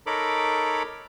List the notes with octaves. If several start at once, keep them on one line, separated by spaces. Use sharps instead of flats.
D#4 A4 A#4 C#5 B5 D6